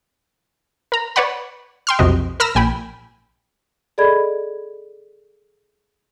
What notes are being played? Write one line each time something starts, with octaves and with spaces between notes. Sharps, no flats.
A#4 A#5
B4 C#5 D5 F#5 B5
G5 C6 F6
B1 F2 C3 F#4 D#5
A#4 B5 E6 F6 A#6
A#1 A#2 G5 G#5 B5
G#4 A4 D5 D#5 B5 G#6